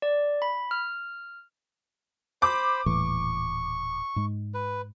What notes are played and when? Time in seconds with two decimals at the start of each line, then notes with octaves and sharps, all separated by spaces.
0.02 D5
0.42 B5
0.71 F6
2.42 C5 B5 D6
2.86 D#1 A2 E3 C#6
4.16 G#2 G#3
4.54 B4